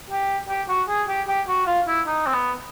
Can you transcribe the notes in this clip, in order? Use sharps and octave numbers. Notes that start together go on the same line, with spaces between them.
G4
G4
F#4
G#4
G4
G4
F#4
F4
E4
D#4
C4
B3